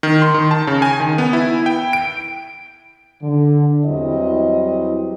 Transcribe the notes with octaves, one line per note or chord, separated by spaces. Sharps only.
D#3
C6
D#3
A5
C#3
G#5
D#3
B3
E4
G5
D7
D3
E2 F#3 G3 C4 E4 D#5